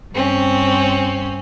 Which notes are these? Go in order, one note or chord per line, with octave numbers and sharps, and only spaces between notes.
G2 C4 C#4